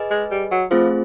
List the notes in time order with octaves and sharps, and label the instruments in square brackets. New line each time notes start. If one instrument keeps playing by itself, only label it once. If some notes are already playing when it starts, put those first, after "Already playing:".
Already playing: [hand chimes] G#4 B4 D#5 G#5
[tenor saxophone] G#3
G3
F#3
[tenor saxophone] F3 [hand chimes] A3 C4 F4 G#4 C5